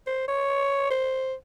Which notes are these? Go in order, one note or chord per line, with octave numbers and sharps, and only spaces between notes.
C5
C#5
C5